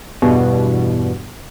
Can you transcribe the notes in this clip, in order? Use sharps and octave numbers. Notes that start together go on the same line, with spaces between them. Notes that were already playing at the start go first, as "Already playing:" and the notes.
E2 G2 B2